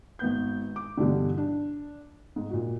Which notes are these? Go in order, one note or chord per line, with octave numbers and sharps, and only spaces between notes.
G#1 B3 G6
D6
G2 B2 D3 E3 G3 D4
D4
G#2
A#2 F#4